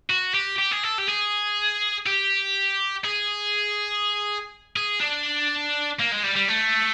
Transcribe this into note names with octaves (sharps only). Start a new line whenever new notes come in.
F#4
G4
G4
G#4
A4
G4
G#4
G4
G#4
G#4
D4
A#3
G#3
G3
G3
A3